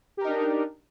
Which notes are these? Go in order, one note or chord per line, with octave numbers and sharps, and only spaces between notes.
D4 D#4 G4 A#4